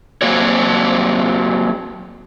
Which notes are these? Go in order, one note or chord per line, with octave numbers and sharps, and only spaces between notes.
F#3 A#3 C4 F#4 C#5